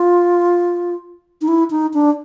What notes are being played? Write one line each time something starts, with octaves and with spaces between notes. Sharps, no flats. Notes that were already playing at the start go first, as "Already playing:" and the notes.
Already playing: F4
D#4
E4
D#4
D4